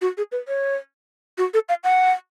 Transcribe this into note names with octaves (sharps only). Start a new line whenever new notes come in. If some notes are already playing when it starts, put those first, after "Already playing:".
F#4
G#4
B4
C#5
F#4
A4
F5
F#5